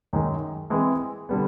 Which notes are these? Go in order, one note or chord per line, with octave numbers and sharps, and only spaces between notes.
F#2 D#3 G#3
E3 G#3 C4 E4 G#4
D3 G3 B3